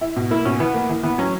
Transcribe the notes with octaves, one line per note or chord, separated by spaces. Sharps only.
E4
B2
A#3 E4
B2 C#4
E3 B3
A#3
E3
E3 B3
F#3 C#4